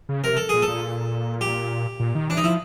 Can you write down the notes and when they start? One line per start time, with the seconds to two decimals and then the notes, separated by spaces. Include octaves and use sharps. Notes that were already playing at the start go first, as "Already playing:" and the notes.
0.09 C#3
0.24 C3 A#4
0.37 A4
0.49 A#2 G#4
0.62 A4
0.67 A#2
1.41 G4
2.00 A#2
2.15 D#3
2.29 E3 D4
2.37 D#4
2.44 F3 E4